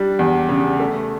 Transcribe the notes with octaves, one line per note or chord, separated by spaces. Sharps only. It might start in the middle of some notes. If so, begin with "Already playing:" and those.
Already playing: G3 D4
E2
C#3
A3